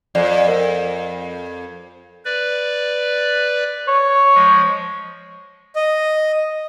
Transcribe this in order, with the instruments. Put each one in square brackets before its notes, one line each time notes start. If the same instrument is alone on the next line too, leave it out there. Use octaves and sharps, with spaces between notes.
[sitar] F2 [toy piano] A4 D5
[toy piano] A#4 F#5
[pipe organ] B4 D5
[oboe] C#5
[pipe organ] F3 G#3
[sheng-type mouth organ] D#5